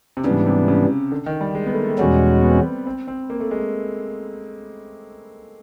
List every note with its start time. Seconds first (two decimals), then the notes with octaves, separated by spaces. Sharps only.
0.17 C3
0.24 G#2 C#3 E3 G3 B3 D4
0.46 C3
0.68 C#3
1.12 D3
1.26 D#3
1.41 G3
1.55 G#3
1.66 B3
1.73 A3
1.77 A#3
1.88 A3
1.98 E2 B2 G3 G#3 C#4 F#4
2.43 B3
2.50 C4
2.59 B3
2.86 C4
3.08 C4
3.30 A#3
3.40 A3
3.51 G#3